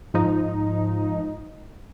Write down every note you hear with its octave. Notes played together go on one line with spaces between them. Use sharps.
G#2 F3 D#4